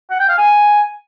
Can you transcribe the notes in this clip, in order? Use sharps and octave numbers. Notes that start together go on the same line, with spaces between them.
F#5
G5
F5
G#5